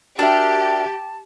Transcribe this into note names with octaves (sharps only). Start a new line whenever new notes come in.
D4 F#4 G4 A#4 E5 A5